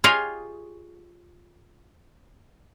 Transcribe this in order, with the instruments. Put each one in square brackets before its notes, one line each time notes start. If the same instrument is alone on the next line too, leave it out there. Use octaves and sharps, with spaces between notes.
[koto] F4 G4 G#4 C#5 D#5 F5